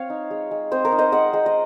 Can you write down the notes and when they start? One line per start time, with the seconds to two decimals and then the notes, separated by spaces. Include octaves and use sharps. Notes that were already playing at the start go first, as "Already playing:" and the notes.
Already playing: C4 C#5 F5
0.10 D#4
0.31 G#3
0.51 G#3
0.71 C4 C5 D#5
0.85 A#4 C#5
0.92 D#4
0.98 C5 D#5
1.12 G#3 D#5 F#5
1.33 G#3
1.46 D#5